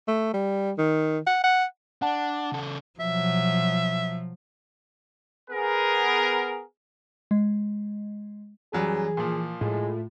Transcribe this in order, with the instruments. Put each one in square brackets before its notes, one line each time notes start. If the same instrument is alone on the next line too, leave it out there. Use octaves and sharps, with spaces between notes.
[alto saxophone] A3
G3
D#3
F#5
F#5
[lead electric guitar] D4 [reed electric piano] F#5 A5
[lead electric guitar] C#3 A4
[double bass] B2 F#3 [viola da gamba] F3 [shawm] E5
[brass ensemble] B3 G#4 A#4
[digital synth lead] G#3
[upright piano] F#2 F#3 G3 [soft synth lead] E3 [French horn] G#4
[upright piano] A#2 F3
[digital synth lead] A2 [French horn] G#3 [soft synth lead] F4